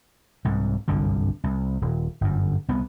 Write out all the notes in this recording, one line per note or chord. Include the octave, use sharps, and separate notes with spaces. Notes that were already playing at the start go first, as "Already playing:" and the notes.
C2 G#2
G1 C2 F#2 D3
C2
D#1
G1 F#2
C2 B3